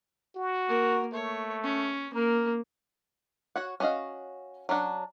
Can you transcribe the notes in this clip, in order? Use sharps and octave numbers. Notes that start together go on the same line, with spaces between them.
F#4
A#3 A#4
A3 C#5
C#4
A#3 A#4
F#4 C#5 F#5
C#4 D4 F#4 D#5 F5
F#3 C#4 D4 F#5